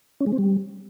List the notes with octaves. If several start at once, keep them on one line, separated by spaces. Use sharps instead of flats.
C#4
G#3
C4
G3